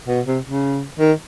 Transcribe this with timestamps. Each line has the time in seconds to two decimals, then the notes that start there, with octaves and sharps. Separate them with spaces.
0.08 B2
0.27 C3
0.46 C#3
0.99 D#3